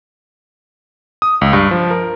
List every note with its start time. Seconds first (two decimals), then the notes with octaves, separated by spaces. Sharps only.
1.22 D#6
1.41 C#2
1.53 G2
1.71 F3
1.91 A#4